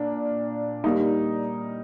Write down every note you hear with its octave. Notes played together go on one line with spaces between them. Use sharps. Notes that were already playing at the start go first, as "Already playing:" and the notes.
Already playing: A#2 A#3 D4
G3 A#3 D#4